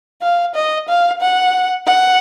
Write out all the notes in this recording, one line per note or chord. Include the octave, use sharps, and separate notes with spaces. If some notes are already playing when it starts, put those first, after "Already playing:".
F5
D#5
F5
F#5
F#5